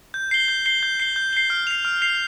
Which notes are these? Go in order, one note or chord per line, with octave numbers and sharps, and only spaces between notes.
G6
C7 G7
G6
C7 G7
G6
C7 G7
G6
C7 G7
F6
C7 F7
F6
C7 F7